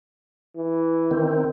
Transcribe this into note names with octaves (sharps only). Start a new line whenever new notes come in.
E3
D#3 C4